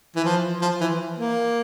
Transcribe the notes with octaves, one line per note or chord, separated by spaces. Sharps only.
E3
F3
F3
E3
A#3